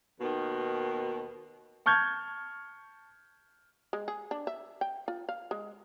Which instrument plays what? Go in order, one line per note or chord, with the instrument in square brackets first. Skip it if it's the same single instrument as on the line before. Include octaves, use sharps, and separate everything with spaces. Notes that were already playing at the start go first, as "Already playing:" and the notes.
[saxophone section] D#2 B2 D#3
[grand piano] A5 C#6 F6 G6 G#6
[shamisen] G#3
G#4
D4
E5
G5
F4
F5
G#3